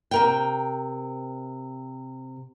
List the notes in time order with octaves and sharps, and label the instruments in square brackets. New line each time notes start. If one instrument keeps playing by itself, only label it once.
[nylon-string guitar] C3 A#4 G5